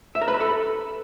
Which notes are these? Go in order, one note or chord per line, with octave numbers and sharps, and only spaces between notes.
E5
A#4
B4
B5
A4